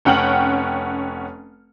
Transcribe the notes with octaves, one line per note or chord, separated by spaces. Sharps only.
F1 C#4 F#5 G5 F6 F#7